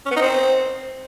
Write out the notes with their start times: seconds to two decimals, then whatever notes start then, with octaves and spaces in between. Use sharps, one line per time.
0.06 C#4
0.11 B3
0.16 D#4
0.21 C4